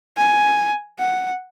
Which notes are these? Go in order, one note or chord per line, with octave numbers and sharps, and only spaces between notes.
G#5
F#5